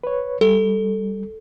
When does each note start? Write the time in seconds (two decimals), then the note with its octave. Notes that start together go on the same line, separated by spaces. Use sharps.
0.04 B4 C#5
0.41 G3 A4